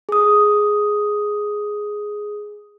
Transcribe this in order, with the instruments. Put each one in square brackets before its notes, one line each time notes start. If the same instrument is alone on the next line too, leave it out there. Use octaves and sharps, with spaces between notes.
[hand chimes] G#4 D#6